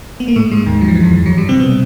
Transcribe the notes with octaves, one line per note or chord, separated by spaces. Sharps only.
B3
A#3
A2 A3
G#2 G#3
D#2 D#3
F#3
F3
E3
F2 F3
F3
F#2 F#3
G2 G3
C3 C4
B2 B3